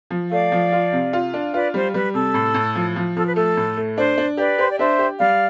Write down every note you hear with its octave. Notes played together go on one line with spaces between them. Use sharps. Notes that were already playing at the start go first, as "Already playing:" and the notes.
F3
A3 D5 F5
F3
F4
C3
F4
D4
F4 B4 D5
G3 C5
G3 B4
C3 A4
A2
A2
F3
F3
F3 A4
B4
A3 A4
A2
A3
D4 C5
D4
G4 B4 D5
G4 C5
D5
D4 C5 E5
G4
G3 D5 F5